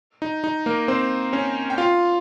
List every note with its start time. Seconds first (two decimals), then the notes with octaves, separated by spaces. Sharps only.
0.22 D#4
0.44 D#4
0.66 A#3 A#4
0.88 C4 C5
1.33 C#4 C#5
1.70 G5
1.78 F4 F5